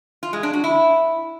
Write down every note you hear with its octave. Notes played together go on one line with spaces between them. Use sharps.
F4
G#3
D4
F#4
E4